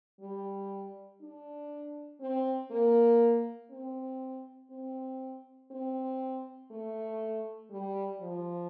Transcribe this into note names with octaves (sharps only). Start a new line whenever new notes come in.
G3
D4
C4
A#3
C4
C4
C4
A3
G3
F3